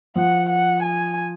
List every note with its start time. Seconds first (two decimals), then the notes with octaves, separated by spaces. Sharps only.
0.16 F3 F#5
0.49 F#5
0.83 G#5